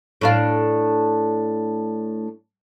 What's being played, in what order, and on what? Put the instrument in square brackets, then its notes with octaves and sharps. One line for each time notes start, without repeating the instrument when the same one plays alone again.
[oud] A2 D4 F5